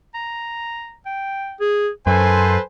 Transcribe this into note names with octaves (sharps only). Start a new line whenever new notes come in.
A#5
G5
G#4
F#2 A4 B4 C5 G#5